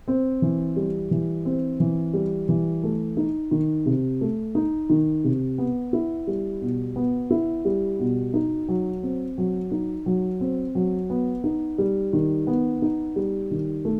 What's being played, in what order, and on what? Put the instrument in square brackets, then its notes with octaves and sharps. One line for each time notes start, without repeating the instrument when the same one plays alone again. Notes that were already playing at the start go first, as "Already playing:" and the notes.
[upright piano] C4
E3
G3
E3
C4
E3
G3
E3
A3
D#4
D#3
C3
A3
D#4
D#3
C3
B3
E4
G3
B2
B3
E4
G3
B2
D#4
F#3
C4
F#3
D#4
F#3
C4
F#3
B3
D#4
G3
D#3
B3
D#4
G3
D#3
A3